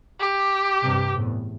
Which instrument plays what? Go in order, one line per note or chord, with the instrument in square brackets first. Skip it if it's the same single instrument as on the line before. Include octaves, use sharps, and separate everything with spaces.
[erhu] G4
[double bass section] G2 C3
E2 A2